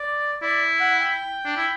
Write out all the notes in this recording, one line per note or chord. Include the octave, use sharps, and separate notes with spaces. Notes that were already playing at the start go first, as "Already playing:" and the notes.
Already playing: D5
E4 D5
F#5
G5
D4
E4